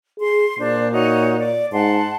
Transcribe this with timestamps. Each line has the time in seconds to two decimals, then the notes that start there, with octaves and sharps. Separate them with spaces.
0.20 G#4 C6
0.59 A#2 D4 C5
0.93 D#4 F#4 C#5
1.38 D5
1.72 G#2 F#5 A5 C6